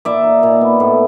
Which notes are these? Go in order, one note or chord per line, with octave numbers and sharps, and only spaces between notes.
A#2 D5 E5
D#4
A#2
B3
A2